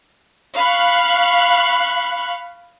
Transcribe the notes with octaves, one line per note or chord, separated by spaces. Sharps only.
F5 B5 C#6 F#6